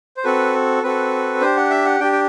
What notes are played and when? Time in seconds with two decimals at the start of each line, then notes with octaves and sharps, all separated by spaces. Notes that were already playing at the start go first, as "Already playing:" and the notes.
0.17 C5
0.24 C4 F#4 A4 B4
0.83 C4 F#4 A4 B4
1.41 D4 G4 C5
1.57 F#5
1.70 E5
1.85 F#5
2.00 D4 G4 G5
2.12 G5